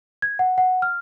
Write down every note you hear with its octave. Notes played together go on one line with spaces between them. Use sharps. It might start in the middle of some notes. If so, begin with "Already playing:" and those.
G#6
F#5
F#5
F6